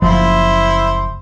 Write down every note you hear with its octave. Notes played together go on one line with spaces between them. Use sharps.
F#1 F3 E4 C5